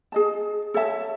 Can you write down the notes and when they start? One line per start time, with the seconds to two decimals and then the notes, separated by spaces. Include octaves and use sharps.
0.12 G#4 D#5 A5
0.74 A4 C#5 E5 A5